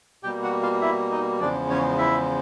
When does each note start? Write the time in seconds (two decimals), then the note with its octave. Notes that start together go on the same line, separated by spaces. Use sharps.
0.23 B2 G3 A#3 G4 G5
0.43 F#4 F#5
0.63 F4 F5
0.81 E4 E5
1.11 D#4 D#5
1.40 E2 C#3 F3 G#3 D4 D5
1.70 C#4 C#5
1.98 E4 E5